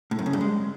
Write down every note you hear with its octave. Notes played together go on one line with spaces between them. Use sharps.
A2
F#2
C#3
G2
G#3